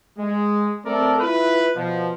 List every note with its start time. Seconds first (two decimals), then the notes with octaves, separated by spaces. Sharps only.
0.18 G#3
0.85 A3 C4 A4 A#4 D5
1.19 E4 F4 B4
1.76 B2 F3